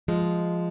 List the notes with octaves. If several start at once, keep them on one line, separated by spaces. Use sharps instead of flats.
F3 G#3